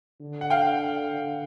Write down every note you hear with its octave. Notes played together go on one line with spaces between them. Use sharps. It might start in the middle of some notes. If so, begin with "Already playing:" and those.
D3
F#5
F5 G5